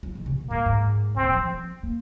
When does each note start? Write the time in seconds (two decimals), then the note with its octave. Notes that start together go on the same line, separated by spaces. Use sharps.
0.03 F3
0.15 D#3
0.26 C3
0.38 A#2
0.50 G#2 A#3
0.66 G#2
1.16 A#2 C4
1.24 D#3
1.34 F3
1.50 C4
1.83 A#3